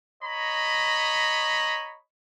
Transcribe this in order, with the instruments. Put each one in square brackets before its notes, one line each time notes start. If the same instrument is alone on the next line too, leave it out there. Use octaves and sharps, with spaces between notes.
[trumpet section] C#5 D#5 A#5 B5